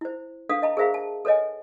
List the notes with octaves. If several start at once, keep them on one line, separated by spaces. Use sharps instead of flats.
E4 C5
D4 A4 B4 F5 D#6
D#5 A5 A#5
G#4 A#4 C5 E5 F5 A#5
A5
A4 B4 C#5 D#5 G#5